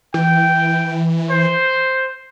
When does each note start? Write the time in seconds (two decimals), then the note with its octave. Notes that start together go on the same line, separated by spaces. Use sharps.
0.14 E3 G5
1.31 C5